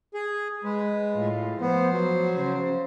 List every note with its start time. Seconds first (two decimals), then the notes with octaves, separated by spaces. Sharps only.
0.14 G#4
0.64 G#3 B4
1.16 A2 F4
1.61 F3 B3 C5
1.92 F#3
2.36 C#3 C5